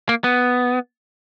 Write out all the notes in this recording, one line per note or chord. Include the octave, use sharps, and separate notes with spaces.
A#3
B3